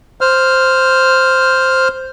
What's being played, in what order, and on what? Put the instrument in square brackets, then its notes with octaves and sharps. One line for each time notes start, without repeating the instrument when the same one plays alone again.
[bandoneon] C5 F6